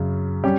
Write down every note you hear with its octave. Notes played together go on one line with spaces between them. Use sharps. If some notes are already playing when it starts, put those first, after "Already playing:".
Already playing: F#2 C#3 F#3
G3 C#4 G4